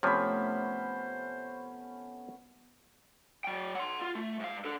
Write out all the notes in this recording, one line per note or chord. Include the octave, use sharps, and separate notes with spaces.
C3 F3 A3 B3 C#4 C5 B5
F#3 G5
F#5 C6
F4
A3
G#2 F5
D4 A4